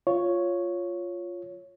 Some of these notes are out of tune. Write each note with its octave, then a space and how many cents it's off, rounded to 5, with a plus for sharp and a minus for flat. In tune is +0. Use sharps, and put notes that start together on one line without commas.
F4 +0 C#5 +0